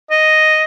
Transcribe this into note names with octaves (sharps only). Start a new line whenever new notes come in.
D#5